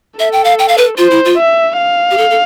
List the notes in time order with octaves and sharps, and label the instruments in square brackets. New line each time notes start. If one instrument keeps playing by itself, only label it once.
[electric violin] A4 [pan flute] E5
[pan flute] G5
F5
G5
F5
B4
[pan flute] F4 [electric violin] C5
[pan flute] E4
F4
[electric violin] E5
F5
[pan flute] G4
A4
A4